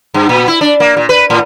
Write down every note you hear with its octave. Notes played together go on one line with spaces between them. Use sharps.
G2
A#2
E4
D4
A#3
A#2
B4
A2